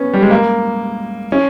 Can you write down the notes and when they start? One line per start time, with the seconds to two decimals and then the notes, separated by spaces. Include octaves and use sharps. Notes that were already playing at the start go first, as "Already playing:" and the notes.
Already playing: B3 C#4
0.13 G3
0.22 G#3
0.31 A#3
1.32 C#4